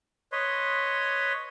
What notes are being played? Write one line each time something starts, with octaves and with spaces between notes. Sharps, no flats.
B4 C#5 D#5 C6